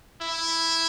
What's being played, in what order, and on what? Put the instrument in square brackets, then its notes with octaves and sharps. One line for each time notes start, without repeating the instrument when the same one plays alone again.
[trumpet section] E4